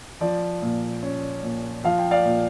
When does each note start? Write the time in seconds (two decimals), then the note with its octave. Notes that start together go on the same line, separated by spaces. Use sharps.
0.21 F3 D5
0.62 A#2
1.03 C#4
1.43 A#2
1.84 F3 F5
1.98 G5
2.11 D5 F5
2.26 A#2